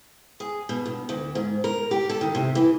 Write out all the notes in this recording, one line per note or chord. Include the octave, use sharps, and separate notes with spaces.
G#4
B2
G2
D2
G#2
A#4
G4
A4
D#3
C3
E3